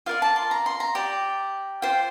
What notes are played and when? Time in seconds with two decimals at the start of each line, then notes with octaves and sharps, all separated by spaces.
0.06 F4 A#4 D5 F5
0.22 A5
0.36 C6
0.51 A#5
0.66 C6
0.80 A#5
0.95 G4 D5
1.82 F4 C5 G5